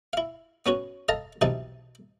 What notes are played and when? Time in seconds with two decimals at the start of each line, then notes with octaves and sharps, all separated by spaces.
0.13 E4 F5
0.66 B3 C#4 F#4 C#5
1.09 A4 D#5 F5 A5 A#5
1.41 B1 C3 E3 D#4 A5